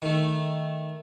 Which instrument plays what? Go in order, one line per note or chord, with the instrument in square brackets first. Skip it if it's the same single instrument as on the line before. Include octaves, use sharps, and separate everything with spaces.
[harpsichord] D#3 A3